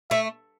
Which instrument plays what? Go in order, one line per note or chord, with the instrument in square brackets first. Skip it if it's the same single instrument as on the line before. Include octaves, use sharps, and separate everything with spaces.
[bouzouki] A3 [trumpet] E5